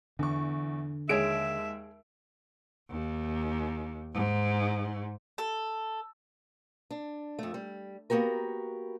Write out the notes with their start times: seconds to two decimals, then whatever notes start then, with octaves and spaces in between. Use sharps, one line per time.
0.19 E2 D3 C#6
1.09 D#2 G#3 G#4 C#5 E5 D7
2.90 D#2
4.14 G#2
5.38 A4
6.90 D4
7.39 F2 A3
7.54 G3
8.10 A#3 B3 F#4 G4 A#4